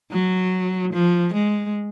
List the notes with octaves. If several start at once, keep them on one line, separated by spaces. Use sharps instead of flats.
F#3
F3
G#3